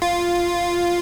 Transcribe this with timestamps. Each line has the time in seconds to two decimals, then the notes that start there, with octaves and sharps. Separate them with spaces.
0.02 F4